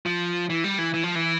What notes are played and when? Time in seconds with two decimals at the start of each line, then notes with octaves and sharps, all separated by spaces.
0.06 F3
0.50 E3
0.64 G3
0.78 E3
0.94 E3
1.04 F3
1.15 E3